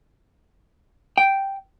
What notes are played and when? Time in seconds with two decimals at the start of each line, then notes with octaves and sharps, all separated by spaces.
1.18 G5